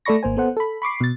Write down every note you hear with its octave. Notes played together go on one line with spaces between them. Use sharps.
A3 A4 D5 B5 C#6 A#6
G#1 A#3 C5 G#5
B3 A4 C5 F#5
A4 B5
B5 C#6 D6 C7
B2 A6